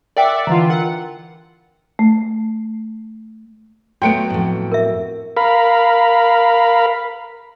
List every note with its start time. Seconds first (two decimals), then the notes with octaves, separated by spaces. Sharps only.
0.17 A#4 D5 E5 F#5 G5
0.47 D3 E3 F4 A#5
0.70 A#4 F#5
1.99 A3
4.02 F#3 A3 B3 G5 C6 C#7 D7
4.30 F2 A2
4.71 A#4 E5
5.37 A#4 F5 B5